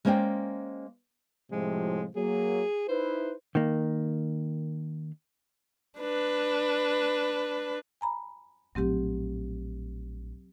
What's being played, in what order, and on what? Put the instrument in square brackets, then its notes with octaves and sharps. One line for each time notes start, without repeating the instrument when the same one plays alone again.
[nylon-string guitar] G#3 A#3 C#4 C5 D5 G5
[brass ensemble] A2 C3 F3 [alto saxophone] G#3
[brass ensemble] F#3 A#3 [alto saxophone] G#4
[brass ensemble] D#4 E4 B4 [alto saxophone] C5
[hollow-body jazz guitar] D#3 A#3
[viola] D4 B4
[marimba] G#5 A#5 B5
[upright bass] A#1 A2 [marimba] F#3 C4 G4